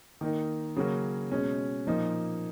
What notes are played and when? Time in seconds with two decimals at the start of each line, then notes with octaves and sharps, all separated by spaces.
0.21 D#3 A#3 D#4
0.76 C#3 F#3 A#3 C#4 F#4
1.31 B2 G#3 C#4
1.87 A#2 F3 A#3 D#4